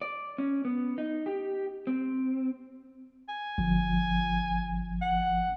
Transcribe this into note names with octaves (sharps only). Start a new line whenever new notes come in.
D5
C#4
B3
D#4
G4
C4
G#5
G1 F3
F#5